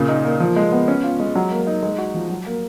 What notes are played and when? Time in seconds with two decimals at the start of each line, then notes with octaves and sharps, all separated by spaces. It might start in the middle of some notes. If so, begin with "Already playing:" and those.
Already playing: A#2 C#3
0.08 D#4
0.24 A#3
0.40 F3
0.56 G#3
0.72 B3
0.88 C#4
1.03 F4
1.20 G#3
1.35 F#3
1.51 A#3
1.67 D#4
1.83 G#3
1.98 F#4
2.14 F3
2.30 F#3
2.46 A#3